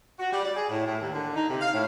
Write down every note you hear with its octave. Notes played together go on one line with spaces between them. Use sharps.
F#4
G3
D5
G#4
A2
A2
D#2
D3
D#4
C3
F5
A2